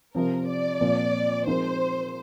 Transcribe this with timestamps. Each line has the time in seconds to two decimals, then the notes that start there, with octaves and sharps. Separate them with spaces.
0.15 C3 F3 C4 A#4
0.48 D5
0.81 A#2 F3 C4
1.47 F3 G#3 C4 D#4 A#4 C5